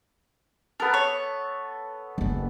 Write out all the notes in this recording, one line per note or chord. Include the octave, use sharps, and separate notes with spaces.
B3 A4 A#4
C#5
F#1 C#4